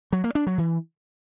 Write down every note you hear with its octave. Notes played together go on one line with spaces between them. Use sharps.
F#3
A#3
D4
F#3
E3